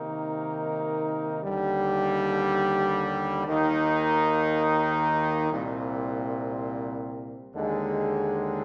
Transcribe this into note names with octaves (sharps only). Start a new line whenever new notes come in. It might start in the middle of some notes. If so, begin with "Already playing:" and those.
Already playing: C3 D#3 A#3 D#4 A#4
D#2 D3 G3
D#2 D#3 A#3 D#4
C2 A#2 G3 C4
D#2 D3 G#3